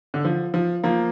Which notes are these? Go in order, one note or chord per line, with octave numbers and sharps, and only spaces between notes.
D3
F3
F3
F3 A#3